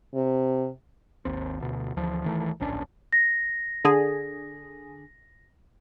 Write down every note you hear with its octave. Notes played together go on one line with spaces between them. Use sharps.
C3
G#1 D#2 C4
D2 B2
D2 E3 F3
D#1 D#3 E3 A3
D1 A#1 C#4 D4
A#6
D3 G#4